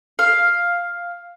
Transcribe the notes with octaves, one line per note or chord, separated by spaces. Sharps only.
F5